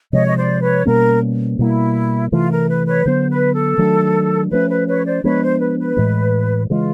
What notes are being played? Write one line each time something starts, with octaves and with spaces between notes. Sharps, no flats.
C3 F3 G#3 C#5 D#5
D#5
C5 D5
B4 C#5
B2 G3 A#3 C#4 A#4
B2 G3 A#3 E4
C3 E3 A3 F4
A#4
B4
B4 C#5
D3 F#3 B3 C5
B4
A4
D#3 F#3 A3 D4
F3 A3 C#4 B4
B4
B4 C#5
C5 D5
F3 G#3 B3 D4 B4 C#5
C5
B4
B4
A2 E3 G#3
C#3 E3 G#3 F4